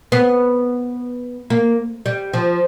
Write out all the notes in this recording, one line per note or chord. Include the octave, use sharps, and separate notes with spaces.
B3
A#3
G3
F3